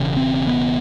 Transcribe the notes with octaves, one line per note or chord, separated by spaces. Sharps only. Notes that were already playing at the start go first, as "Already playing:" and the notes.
Already playing: E1 E2 C#3
C4
B3